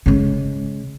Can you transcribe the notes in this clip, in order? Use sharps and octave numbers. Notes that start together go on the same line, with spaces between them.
C#3 G#3